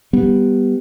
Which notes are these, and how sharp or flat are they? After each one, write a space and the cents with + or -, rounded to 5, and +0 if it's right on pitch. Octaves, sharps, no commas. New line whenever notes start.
G3 +0 B3 -10